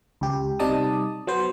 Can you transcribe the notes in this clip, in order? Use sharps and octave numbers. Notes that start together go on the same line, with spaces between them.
C#2 G4
C3 G3 D#4 D5 A5 D#6
F#3 B3 C5